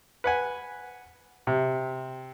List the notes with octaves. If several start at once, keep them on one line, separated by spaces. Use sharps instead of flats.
B4 F#5 G#5
C3